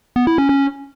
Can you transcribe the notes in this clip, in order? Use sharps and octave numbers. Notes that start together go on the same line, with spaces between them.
B3
E4
C#4
C#4